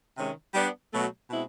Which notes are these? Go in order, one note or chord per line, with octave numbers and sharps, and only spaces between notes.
C3 D#3 G#3 C#4
G3 B3 D4
B2 F#3 A3
B2 G#3 C4 E4